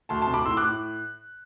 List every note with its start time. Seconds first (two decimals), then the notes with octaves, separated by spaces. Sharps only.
0.09 D2 A5 C6
0.22 A5 C6
0.27 C3
0.34 B5 D6
0.45 A2 C6 E6
0.57 D6 F#6
0.63 A2